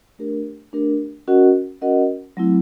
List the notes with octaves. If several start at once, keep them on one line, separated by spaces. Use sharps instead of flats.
A3 D4 G4 A#4
A3 D4 G4 A#4
C#4 F#4 A#4 D#5 F#5
C#4 F#4 A#4 D#5 F#5
F#3 A3 C4 E4